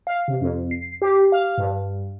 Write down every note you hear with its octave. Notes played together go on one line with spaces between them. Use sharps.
F5
C3
F2
C7
G4
F5
G2